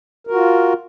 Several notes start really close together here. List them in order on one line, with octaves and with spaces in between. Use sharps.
A#4 F#4 F4